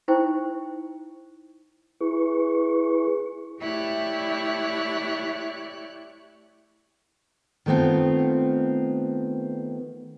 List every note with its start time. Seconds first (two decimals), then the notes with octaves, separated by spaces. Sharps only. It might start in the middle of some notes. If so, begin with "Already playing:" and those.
0.08 D#4 E4 C5 G5 C#6
2.00 E4 G#4 B4 C#6
3.61 A3 E4 G4 C#5 D5 F#6
7.66 D#3 A3 B3 C4 F4